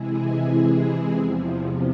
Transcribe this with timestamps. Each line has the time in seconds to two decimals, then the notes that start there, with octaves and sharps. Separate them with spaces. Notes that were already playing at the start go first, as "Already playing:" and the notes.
Already playing: C3 E3 G#3 E4 G#4
1.14 E2 C3 F3